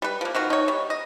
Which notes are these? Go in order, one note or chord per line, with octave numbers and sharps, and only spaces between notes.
G3 B4
F3 A#3
D#3 F3 F#4
D#4 C#5
G3
D#5